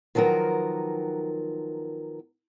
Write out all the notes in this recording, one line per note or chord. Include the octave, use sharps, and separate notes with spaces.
D#3 F3 F#3 B3 A#4